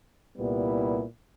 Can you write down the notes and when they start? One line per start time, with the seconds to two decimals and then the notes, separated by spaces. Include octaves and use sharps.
0.37 C2 A#2 G3 B3 E4